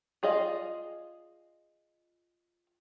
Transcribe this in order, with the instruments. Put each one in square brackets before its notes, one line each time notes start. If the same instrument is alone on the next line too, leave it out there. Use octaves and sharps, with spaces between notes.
[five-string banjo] F4 G#4 D5 D#5 F5